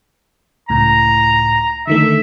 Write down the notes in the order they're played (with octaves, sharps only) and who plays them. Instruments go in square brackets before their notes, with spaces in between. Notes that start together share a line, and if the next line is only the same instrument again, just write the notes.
[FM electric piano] C#2 A2 [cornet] A#5
[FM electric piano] D3 D#3 A3 [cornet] E5